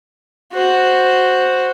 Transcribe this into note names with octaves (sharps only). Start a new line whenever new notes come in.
F#4 C5